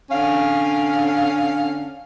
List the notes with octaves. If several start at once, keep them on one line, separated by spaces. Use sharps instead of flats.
D3 C#4 F5